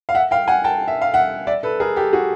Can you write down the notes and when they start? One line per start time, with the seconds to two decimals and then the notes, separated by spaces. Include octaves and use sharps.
0.09 F5
0.15 E5 F#5
0.31 F5 G5
0.48 F#5 G#5
0.64 G5 A5
0.88 E5
1.01 F5
1.14 E5 F#5
1.47 D5 E5
1.63 A4 B4
1.80 G#4 A#4
1.96 G4 A4
2.13 F#4 G#4